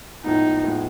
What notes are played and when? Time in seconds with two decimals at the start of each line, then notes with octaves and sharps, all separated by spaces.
0.24 A2 F3 G#3 B3 D#4
0.64 A2 F3 G#3 B3